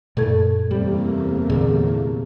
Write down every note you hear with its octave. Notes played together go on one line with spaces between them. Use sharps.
F#2 A#2 A3 A4 G#6
E2 C3 G3 A3 A#3 G4
A#2 D3 G#4